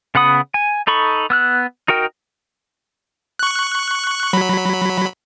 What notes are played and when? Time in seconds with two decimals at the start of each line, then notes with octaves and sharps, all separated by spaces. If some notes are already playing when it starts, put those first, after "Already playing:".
0.15 C#3 B3 F#5 B5 D#6
0.54 G#5
0.87 D#4 A4 B5 C#6
1.30 B3 E6 F#6
1.88 D#4 F#4 A#4 G5
3.39 C#6 F#6
4.33 F#3 B5